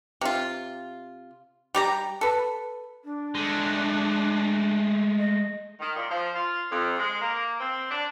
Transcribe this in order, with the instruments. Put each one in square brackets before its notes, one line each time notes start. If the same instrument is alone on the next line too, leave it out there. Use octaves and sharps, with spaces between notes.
[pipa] C3 F4
G3 G4 A#5
A4 B4
[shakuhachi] D4
[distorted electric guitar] G#3 A3
[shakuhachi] D#5
[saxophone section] D#3
A#2
F3
F4
F2
G#3
A#3
C4
D4